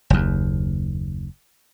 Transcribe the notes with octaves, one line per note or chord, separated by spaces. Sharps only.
F#1 D#2